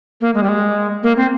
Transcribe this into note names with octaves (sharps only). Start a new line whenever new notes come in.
A#3
G#3
G3
G#3
A#3
C4